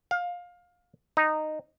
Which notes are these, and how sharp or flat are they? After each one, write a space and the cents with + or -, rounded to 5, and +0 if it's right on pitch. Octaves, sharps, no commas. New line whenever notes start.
F5 +20
D#4 -10